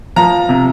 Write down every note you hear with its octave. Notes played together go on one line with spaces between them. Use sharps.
F3 A#5
C3